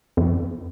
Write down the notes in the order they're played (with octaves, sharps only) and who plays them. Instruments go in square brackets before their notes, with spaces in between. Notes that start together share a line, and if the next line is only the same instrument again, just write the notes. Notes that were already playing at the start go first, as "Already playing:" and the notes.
[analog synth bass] F2